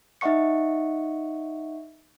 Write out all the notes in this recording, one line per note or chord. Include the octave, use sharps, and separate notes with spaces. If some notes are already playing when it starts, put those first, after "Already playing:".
D#4 D#5 E5 F#5 C#6 C#7